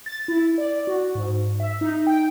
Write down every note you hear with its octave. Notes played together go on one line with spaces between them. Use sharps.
A6
E4
D5
F#4
G#2
E5
D#4
G5